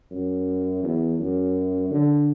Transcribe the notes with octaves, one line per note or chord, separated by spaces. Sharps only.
F#2
E2
F#2
D3